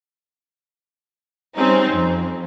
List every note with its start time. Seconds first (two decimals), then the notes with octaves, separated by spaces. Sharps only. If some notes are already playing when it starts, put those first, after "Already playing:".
1.56 G3 C4 C#4 D#4
1.91 F2